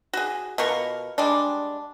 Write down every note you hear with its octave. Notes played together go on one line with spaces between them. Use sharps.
F#4 G#4
B2 F4 A#4 C#6
G3 G#3 D4